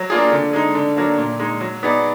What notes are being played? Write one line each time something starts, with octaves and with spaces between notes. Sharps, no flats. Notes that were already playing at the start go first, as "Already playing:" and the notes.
Already playing: F#3
A#3 D4 F4 G#4
D3
G#3 D#4
D3
F#3 A#3 D4
A#2
G#3 D#4
F#3
B3 D#4 G#4 D5